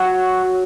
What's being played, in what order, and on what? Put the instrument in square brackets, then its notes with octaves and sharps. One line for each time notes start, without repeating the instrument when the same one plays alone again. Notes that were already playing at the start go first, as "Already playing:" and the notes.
Already playing: [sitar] F#3